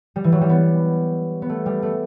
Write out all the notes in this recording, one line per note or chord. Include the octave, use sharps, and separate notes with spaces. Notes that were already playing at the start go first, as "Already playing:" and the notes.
G3
E3
F#3
G3
B3
B3
A3
G3
A3